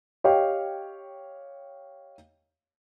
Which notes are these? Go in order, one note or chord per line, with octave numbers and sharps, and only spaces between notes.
G4 C#5 D#5 F5 G5